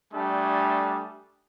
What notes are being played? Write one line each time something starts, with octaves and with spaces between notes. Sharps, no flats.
G3 A3 D4 G#5 D#6